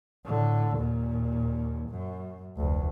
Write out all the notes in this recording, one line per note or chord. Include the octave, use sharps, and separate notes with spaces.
A2 D3
D#2 A#2
F#2
F1 D2